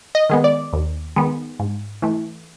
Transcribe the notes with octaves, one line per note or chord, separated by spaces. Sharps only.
D#5
D#3 G#3 B3
D5
D#2
D#3 G#3 B3
G#2
E3 A3